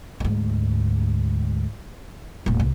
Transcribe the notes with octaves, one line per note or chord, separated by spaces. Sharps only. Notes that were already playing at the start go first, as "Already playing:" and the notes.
D2 G#2
D#1 A2
C2